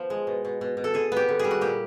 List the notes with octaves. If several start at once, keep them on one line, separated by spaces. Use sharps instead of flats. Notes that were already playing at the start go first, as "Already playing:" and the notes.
Already playing: F3 B3
G#3
B2
B2
B2
B2
A4
D3 G#4
B3 G4
D3
G3 G#4
F#4
A#2 G4